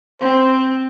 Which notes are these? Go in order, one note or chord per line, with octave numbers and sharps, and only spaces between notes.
C4 C5